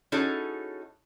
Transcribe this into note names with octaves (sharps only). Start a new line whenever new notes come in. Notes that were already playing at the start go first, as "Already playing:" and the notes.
C#4 D#4 E4 F#4 G#4 A4